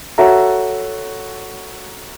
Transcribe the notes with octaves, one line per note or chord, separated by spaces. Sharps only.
F#4 A4 C#5 E5 A#5